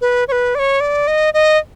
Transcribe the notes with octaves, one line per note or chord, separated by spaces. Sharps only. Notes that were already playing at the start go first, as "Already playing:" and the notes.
B4
C#5
B4
D5
C#5
D5
D#5
D#5